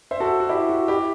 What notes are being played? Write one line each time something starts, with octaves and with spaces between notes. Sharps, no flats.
C5 E5
F#4 A4
F#4
E4 G4
F#4
E4 G4